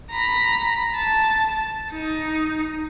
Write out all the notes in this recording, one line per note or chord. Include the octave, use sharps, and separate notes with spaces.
A#5 B5
A5
D#4